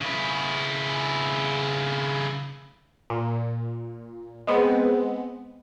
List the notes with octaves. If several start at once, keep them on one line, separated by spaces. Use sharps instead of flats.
C#3 E4
A#2
G#3 B3 C4